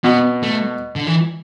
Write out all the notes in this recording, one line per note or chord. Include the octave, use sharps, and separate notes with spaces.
B2 B3
A3
D3
E3